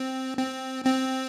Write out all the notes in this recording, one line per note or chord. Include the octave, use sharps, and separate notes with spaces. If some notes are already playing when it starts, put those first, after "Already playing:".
Already playing: C4
C4
C4